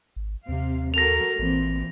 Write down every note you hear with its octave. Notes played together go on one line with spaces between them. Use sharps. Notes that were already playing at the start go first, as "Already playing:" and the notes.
G#1
D#2 C3 F5
F#4 A4 A#4 A#6 F7
A1 A#2 E3 C4